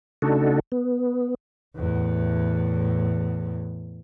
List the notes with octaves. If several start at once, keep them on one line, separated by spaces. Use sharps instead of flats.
C#3 A3 D4 D#4 F#4 A4
B3
E2 A2